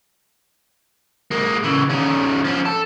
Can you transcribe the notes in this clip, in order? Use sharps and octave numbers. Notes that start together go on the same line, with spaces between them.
G#3 A#3
C#3 E3
D#3 C#4
F3 C#4
A4